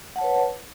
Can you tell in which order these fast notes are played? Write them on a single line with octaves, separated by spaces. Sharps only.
F#5 A5 C#5 B4